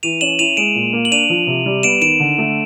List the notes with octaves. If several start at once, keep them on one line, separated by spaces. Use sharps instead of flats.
E3 D#7 F7
C#4 E7 F#7
E4 D#7 F7
G#3 D7 E7
A#2
A#3
F#7
D4 D#7 F7
F3
C3
G3
B3 D7 E7
D#3 D7 E7
D3
A3